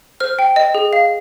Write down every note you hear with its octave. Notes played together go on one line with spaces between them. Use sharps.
C5 F6
G5
D#5
G#4
F5